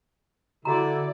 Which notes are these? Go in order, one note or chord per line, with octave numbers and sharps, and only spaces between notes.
D3 E4 F#4 D5 A#5